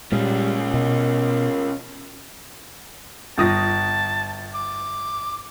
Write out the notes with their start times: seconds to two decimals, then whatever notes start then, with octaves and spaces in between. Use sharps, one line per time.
0.12 A#2 G3 G#3 C#4 F4
0.74 B2 A#4
3.38 G1 G3 F4 A5 D#6 A#6
4.55 D6